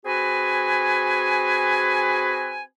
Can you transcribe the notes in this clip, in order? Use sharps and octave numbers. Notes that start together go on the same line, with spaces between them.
C4 F#4 G#4 B4 G#5